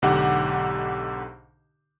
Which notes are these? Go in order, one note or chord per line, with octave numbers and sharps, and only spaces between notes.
B1 G#2 D3 G4 F#5